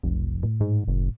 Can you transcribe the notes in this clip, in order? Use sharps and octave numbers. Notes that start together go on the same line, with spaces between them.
F1 B1
A2
G#2
F#1